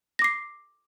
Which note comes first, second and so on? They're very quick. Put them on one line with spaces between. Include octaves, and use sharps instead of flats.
A#6 D6 C7